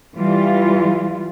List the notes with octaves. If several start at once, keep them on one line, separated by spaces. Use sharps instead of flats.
E3 G3 F4